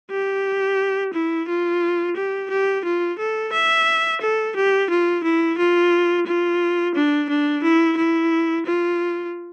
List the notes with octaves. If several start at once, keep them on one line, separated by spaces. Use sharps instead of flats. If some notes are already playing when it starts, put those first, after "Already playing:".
G4
E4
F4
G4
G4
F4
A4
E5
A4
G4
F4
E4
F4
F4
D4
D4
E4
E4
F4